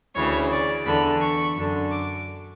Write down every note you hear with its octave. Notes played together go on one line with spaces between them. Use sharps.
D2 C#3 E3 C#5
D5
E2 D3 B5
C#6
F#2 D3
D6